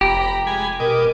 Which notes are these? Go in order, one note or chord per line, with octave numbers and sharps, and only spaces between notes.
F1 G4 A#5 B5
G#3 G#5 B5
B2 A#4 D#5 D6